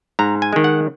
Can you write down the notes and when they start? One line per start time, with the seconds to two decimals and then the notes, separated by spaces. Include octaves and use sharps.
0.19 G#2 A#5
0.42 G#5
0.53 D#3 G#3
0.64 F#5